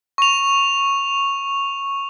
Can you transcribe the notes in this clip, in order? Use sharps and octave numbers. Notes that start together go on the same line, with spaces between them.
C#6 F7